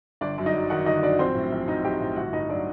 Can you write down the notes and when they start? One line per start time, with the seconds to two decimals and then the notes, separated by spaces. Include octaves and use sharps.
0.21 G1 D4 D5
0.38 F#2
0.46 D#4 D#5
0.54 F#3
0.70 D#3 F#4 F#5
0.86 G1 D#4 D#5
1.03 F#2 D4 D5
1.19 A#1 C4 C5
1.35 A2
1.52 A#1
1.68 F#3 D#4 D#5
1.84 A#1 G4 G5
2.01 A2
2.16 G1 F#4 F#5
2.33 G2 D#4 D#5
2.49 F#3 D4 D5